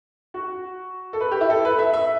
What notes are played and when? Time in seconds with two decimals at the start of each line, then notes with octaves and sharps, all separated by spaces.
0.34 F#4
1.13 A4
1.21 B4
1.31 G4
1.41 E4
1.50 A4
1.65 B4
1.79 E5
1.93 E5